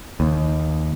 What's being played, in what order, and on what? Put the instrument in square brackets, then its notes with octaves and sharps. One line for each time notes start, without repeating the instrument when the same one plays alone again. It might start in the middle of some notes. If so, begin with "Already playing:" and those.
[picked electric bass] D#2